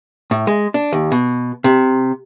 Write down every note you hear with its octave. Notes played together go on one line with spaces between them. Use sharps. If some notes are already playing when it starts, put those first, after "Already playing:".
A2
G#3
D4
D#2
B2
C3